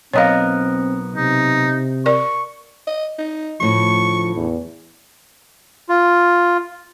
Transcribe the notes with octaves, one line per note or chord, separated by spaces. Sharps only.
B1 B3 C4 A#4 C#5 D#5 F5
C3 D#4
A#4 D5 C#6
D#5
D#4
D2 A2 F3 C#6
E2
F4